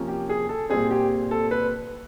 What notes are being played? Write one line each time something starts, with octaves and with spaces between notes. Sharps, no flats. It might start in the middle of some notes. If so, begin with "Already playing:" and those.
Already playing: C3 F3 A#3 C#4
G4
G#4
A4
A#2 G3 C4 G#4
G4
A4
B4